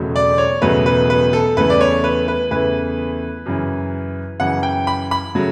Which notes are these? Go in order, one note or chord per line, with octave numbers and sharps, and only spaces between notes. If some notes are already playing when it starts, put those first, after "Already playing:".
Already playing: E1 E2 C#3 F#3 A3
D5
C#5
E1 E2 C#3 F#3 A3 B4
B4
B4
A4
E2 C#3 E3 A3 B4
D5
C#5
B4
B4
E2 C#3 E3 A3 B4
F#2 C#3 E3
F#2 C#3 E3 F#5
G5
B5
B5
C#3 F#3 A3